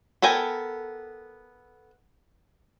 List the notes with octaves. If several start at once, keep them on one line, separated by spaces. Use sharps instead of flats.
B3 A4 A#4 G5 G#5